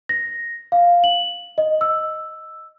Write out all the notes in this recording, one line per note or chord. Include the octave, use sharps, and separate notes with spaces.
A#6
F5
F#7
D#5
E6